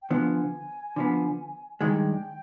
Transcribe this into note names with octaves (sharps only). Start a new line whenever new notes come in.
G5
D3 F3 B3 G#5
D3 F3 B3
G2 D#3 G#3 G5